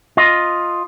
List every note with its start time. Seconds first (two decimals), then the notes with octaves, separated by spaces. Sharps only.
0.17 F4 D#5